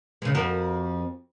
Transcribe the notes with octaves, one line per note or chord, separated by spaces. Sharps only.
C#3 G#3
F2 F#4 A#4